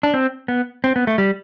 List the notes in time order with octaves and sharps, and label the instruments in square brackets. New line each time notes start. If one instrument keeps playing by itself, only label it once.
[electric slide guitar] D4
C4
B3
C4
B3
A3
G3